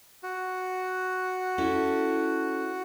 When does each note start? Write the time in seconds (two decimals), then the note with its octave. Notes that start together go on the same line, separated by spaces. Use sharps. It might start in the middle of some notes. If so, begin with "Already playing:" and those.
0.23 F#4
1.58 C#4 E4 A4